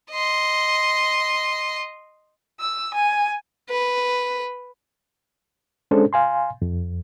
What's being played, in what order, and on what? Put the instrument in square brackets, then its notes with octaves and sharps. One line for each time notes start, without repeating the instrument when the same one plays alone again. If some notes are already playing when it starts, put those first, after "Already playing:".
[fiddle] D#5 C6
[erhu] E6
G#5
[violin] B4
[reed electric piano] G#3 C#4 D4 A4 C5
F5 G#5 C6
F2